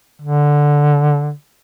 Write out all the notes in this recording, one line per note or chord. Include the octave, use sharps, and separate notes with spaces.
D3